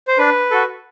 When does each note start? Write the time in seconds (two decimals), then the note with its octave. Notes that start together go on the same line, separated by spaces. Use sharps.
0.08 C5
0.18 D4 B4
0.51 F#4 A4